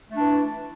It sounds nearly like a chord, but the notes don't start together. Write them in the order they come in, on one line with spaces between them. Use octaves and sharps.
A3 D4 E3